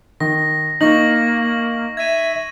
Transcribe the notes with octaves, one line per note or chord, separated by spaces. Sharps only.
D#3 A#6
A#3 D#4 C#6 A#6 F#7
E5 G#6 D#7